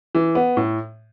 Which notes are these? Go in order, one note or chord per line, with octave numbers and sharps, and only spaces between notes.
E3
B3
A2